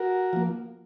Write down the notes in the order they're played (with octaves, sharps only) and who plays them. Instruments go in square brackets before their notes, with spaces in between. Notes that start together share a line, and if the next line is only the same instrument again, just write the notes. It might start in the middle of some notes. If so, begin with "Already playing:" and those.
Already playing: [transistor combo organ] F#4 A#4
F3 A#3